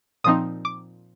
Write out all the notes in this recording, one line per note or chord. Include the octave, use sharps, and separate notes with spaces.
A#2 F3 C4 D#4 D#6
D6